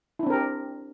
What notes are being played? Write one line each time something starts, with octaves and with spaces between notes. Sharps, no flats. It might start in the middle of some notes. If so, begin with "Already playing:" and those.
C4 D4 E4 G4 A#4